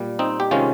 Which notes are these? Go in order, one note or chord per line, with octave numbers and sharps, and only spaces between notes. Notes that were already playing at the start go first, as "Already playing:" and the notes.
Already playing: A#2 G3
C4 D#4
G4
C3 D#3 G#3 C#4 F4